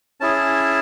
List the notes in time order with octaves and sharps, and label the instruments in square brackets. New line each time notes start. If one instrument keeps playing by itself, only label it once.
[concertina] C#4 E4 G#4 A5